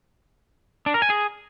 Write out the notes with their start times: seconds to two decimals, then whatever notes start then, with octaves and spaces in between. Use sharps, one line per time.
0.86 D4
0.94 A#4
1.02 G#5
1.10 G#4